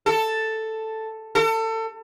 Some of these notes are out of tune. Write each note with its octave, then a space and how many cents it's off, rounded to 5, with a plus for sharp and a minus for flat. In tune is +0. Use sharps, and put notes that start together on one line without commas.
A4 +5
A4 +30